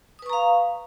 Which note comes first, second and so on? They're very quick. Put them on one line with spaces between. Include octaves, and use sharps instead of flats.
D#6 B4 C#6 A#5 F5